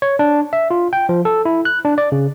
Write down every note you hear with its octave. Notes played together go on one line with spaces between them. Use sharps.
C#5
D4
E5
F4
G5
F3
A4
E4
F#6
D4
D5
C#3